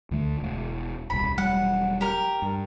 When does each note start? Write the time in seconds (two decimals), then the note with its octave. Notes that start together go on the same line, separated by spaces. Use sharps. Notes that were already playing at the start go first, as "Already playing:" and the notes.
0.11 D2 D3 A3
0.40 E1
1.10 D#1 C2 B5
1.38 E1 F#3 G3 F#5
2.01 G4 A#4
2.42 G2